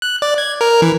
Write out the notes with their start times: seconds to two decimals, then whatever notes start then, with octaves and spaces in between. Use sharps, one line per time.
0.02 F#6
0.22 D5
0.38 G#6
0.61 A#4
0.82 E3